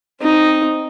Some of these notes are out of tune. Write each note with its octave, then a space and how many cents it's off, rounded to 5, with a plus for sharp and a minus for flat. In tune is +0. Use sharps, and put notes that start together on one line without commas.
C4 +0 D#4 +0